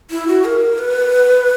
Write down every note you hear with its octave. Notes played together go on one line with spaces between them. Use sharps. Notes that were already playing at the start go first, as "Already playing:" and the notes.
E4
F#4
A#4
B4